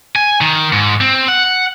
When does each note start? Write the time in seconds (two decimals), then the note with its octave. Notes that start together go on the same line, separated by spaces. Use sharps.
0.16 G#5
0.41 D#3
0.73 G#2
1.01 C4
1.28 F#5